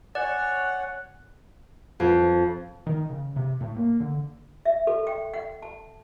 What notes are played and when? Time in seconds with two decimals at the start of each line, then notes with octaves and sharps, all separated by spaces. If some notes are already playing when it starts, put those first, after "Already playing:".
0.15 C#5 D5 F#5 G#5
2.00 F2
2.86 D#3
3.10 C#3
3.36 C3
3.61 A2
3.76 A#3
4.00 D3
4.65 E5
4.87 A4
5.07 G5
5.34 F#5
5.62 A5